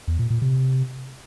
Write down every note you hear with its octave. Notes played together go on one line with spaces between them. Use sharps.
E2
A#2
A#2
C3